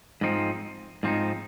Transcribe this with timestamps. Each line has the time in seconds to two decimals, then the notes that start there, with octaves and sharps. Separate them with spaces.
0.21 G#2 F3 C4 D#4
1.03 G#2 F3 C4 D#4